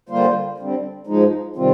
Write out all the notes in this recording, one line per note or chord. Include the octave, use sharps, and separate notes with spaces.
D3 G3 A#3 F4 C5
D3 G3 C4
G#2 F3 G#3 D#4
C3 D#3 G3 C4 F4